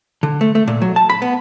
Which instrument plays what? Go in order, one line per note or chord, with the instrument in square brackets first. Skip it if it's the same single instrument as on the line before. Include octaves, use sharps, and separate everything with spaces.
[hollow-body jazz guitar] D3
A3
A3
A#2
F#3
A5
B5
B3